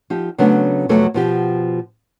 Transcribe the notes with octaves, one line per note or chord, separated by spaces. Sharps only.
F3 D#4 G4
C#3 F#3 A3 B3 D4
F2 C3 F#3 A3 B3 A4
B2 F3 G4